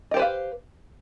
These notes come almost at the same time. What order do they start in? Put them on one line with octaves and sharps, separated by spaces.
D#5 G4 C5 B4 F5